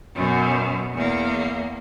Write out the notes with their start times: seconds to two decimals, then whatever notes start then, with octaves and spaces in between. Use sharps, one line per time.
0.15 F#2 B2
0.94 E2 A#3